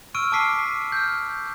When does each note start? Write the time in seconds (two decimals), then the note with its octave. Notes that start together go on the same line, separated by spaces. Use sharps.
0.15 C#6 E6 F6 D7 D#7
0.32 A5 D6 F6 B6 C7
0.92 F6 G6